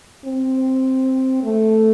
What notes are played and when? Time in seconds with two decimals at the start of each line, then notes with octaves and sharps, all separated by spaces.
0.25 C4
1.43 A3